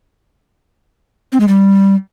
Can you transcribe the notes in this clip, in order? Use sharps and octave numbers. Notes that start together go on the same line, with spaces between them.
C4
G#3
G3